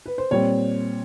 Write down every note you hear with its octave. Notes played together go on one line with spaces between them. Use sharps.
B4
C5
A#2 G3 C4 C#5